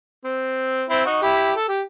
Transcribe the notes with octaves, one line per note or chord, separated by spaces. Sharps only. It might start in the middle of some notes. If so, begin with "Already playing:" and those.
C4
C4 E4
D#4 F#4
E4 G4
A4
G4